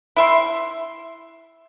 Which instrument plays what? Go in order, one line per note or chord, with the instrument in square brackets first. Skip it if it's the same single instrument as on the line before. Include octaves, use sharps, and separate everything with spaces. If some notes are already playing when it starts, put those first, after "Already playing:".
[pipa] E4 E5 C6